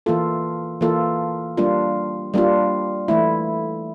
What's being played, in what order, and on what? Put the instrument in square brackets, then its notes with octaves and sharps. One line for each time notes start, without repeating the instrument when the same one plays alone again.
[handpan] E3 A#3 F4 A4
E3 A#3 F4 A4
G3 A#3 D4 F4
G3 A#3 D4 F4
E3 A3 E4